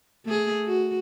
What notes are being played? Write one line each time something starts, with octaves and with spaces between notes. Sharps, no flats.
A3 G#4
F#4